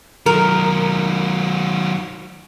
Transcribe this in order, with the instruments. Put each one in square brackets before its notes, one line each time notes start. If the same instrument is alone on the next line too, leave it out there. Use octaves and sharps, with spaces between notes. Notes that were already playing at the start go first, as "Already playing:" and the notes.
[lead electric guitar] D#3 F#3 [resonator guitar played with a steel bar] A#4